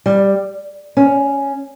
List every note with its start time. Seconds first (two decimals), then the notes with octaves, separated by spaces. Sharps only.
0.06 G3
0.97 C#4